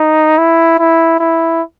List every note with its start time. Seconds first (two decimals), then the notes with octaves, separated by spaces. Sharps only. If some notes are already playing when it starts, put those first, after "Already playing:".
Already playing: D#4
0.38 E4
0.79 E4
1.20 E4